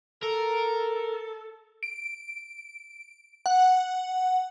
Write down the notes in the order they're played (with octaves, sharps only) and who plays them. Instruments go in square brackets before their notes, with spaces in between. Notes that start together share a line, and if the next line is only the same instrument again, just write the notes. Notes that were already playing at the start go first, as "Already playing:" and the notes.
[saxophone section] A4 [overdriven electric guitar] A#4
[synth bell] D7
F#5